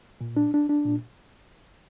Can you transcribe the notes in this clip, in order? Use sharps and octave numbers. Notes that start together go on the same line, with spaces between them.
A#2
D4
D4
D4
A#2